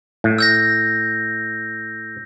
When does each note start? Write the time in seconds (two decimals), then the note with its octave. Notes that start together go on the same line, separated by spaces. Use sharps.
0.24 A2
0.38 E6 G6 A#6